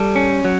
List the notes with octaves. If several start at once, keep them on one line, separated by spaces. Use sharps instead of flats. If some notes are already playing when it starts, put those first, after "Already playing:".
Already playing: G3 A4
C#4
F#3